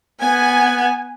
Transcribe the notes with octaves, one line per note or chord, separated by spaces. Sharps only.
B3 G#5